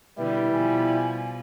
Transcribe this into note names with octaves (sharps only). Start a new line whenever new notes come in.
B2 D3 G3 E4 B4
B2 F3 G#5